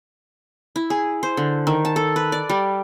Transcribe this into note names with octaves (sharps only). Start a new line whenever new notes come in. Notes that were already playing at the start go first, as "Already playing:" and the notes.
E4
G#4
C5
D3
D#3
A5
A4
B4
D5
G3